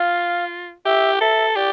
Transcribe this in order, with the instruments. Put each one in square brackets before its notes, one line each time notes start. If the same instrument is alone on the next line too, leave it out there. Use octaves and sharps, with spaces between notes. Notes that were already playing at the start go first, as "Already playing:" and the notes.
Already playing: [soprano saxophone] F4 [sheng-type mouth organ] F5
[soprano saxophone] G4 [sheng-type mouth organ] E5
[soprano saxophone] A4 [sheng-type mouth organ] E5
[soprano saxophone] G4 [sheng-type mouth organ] D5